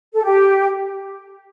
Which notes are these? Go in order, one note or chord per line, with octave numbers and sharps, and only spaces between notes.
A4
G4